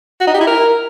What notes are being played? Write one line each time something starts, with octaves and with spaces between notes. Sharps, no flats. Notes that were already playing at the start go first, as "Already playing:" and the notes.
F#4
D#4
G4
E4
A#4